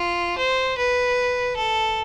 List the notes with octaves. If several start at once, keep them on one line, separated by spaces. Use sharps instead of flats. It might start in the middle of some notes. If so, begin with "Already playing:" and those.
Already playing: F4
C5
B4
A4